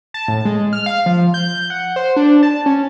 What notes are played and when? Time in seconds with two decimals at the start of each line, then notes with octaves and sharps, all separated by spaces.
0.14 A5
0.28 A2
0.45 G#3
0.73 F6
0.86 F5
1.06 F3
1.34 G6
1.70 F#5
1.96 C5
2.17 D4
2.43 A5
2.66 C#4